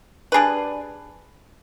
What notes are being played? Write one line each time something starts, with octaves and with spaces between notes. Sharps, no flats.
G3 D4 G#4 B4